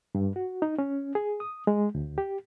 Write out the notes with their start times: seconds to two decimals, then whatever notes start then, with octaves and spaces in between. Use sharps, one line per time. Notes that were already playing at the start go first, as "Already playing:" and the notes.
0.15 G2
0.36 F#4
0.62 D#4
0.79 C#4
1.15 G#4
1.40 D#6
1.67 G#3
1.95 D2
2.18 G4